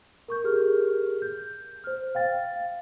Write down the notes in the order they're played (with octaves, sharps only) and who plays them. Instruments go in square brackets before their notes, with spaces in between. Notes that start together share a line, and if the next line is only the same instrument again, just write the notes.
[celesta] A#4 C#6 G6
G4 G#4 A#4 F6
G6
C5 F6
F5 G5 A6
F5